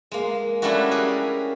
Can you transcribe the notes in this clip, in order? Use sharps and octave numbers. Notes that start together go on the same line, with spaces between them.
G#3 A#3
G3 A3 C#4 D4 E4 F#4
G4 G#4 A#4 G#5